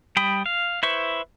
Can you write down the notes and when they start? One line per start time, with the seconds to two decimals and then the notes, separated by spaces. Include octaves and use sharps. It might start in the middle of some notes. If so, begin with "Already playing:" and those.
0.17 G3 G5 B5 D#6
0.46 F5
0.83 E4 B4 C5 E5 C#6